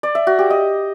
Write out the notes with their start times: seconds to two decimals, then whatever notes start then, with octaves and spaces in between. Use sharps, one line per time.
0.03 D5
0.15 E5
0.27 F#4
0.39 G4
0.50 D#5